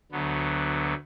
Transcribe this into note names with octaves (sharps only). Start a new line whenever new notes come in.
D2 D3 F#3 B3